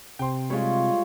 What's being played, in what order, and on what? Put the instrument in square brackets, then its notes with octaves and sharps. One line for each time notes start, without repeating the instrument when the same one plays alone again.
[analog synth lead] C3 [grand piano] G5 C6
[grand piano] G3 G#3 [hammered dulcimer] F4 C#5